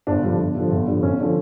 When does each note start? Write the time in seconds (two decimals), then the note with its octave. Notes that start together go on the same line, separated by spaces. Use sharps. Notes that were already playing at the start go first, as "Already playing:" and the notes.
0.07 G1 D4
0.23 G2 D3 F3
0.39 G1
0.55 G2 D3 F3
0.71 G1
0.87 G2 D3 F3
1.03 G1 C#4
1.20 D3 F3